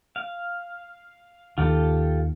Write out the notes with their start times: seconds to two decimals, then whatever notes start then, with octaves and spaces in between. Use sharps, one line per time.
0.16 F5
1.58 D#2 D#3 F4 G4 A4